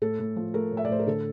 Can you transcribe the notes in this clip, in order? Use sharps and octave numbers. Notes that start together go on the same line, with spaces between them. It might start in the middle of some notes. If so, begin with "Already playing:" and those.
A2 A4
A2
F3
A3 A#4
A2
E5
D5
A2 C5
A#4
D3 A4